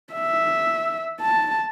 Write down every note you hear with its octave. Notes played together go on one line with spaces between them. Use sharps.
E5
A5